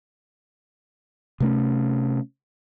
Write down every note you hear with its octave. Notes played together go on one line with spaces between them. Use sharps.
C3 A3 C#4